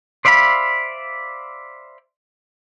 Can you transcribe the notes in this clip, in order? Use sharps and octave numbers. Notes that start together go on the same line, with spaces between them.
C5 D5 E5 F5 B5